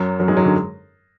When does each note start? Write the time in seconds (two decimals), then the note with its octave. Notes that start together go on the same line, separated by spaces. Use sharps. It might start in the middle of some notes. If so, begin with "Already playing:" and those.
Already playing: F#2 F#3
0.20 F#2 F#3
0.28 G#2 G#3
0.37 F#3
0.45 D3